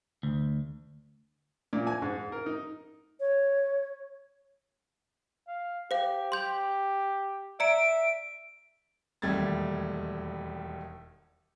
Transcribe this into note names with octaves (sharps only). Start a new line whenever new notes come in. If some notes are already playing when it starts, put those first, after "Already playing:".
D2
A#2
G#5
G#2
A#4
D#4
C#5
F5
G4 C5 F5
G4 C6 G6 F7
D5 E5 A#5 C#7 D7
E1 D#2 G3 A3 G#6 A6